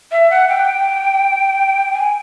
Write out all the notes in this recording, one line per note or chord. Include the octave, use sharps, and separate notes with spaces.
E5
F#5
G5
G#5